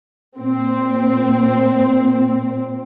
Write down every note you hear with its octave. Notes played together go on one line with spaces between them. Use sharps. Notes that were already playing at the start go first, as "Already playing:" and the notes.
A#2 C4